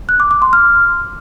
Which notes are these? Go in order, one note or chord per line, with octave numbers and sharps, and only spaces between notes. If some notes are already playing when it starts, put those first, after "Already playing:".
F#6
D6
D6
C6
F6